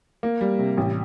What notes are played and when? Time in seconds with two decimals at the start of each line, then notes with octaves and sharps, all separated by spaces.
0.23 A#3
0.41 G3
0.59 C3
0.77 A1